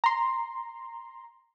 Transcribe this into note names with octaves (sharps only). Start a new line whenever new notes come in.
A#5 C6